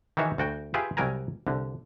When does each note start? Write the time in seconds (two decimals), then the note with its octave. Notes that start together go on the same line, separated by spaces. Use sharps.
0.17 D#3 E3 F#4 G#4 C#5 E5
0.38 D2 F#4 G5
0.74 F4 G4 G#4 B4 E5
0.97 C2 F#3 G3 A#4 G#5 A#5
1.47 C2 D3